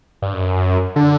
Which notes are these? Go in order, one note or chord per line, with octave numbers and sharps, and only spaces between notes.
G2
F#2
D3